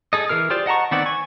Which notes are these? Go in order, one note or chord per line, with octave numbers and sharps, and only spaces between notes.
G#4 A4 D#5
E3 G#4 A#4 F6
F4 G4 G#4 C5 D5
D#5 F#5 A5 A#5 C#6
D#3 B3 C4 D5 F#5
G#5 C#6